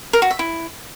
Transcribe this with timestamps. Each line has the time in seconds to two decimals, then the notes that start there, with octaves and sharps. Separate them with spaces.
0.13 A#4
0.22 F#4
0.31 E5
0.39 E4